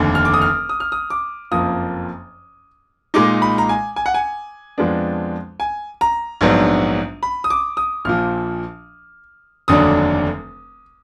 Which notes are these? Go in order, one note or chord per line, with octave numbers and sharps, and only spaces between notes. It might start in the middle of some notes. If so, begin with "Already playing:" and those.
Already playing: F1 D#2 D3
F6
D6
D#6
F6
D#6
F6
D#6
D6
F#1 F2 F3 A#3 D#6
A#2 G#3 D#4 D6
B5
A#5
G#5
G#5
F#5
G#5
F2 F3 G#3 B3 D4
G#5
A#5
A#1 G#2 F#3 B3 D4
B5
D#6
D6
D#6
A#1 A#2 F3 F6
F1 D#2 D3 F#3 D4 D#6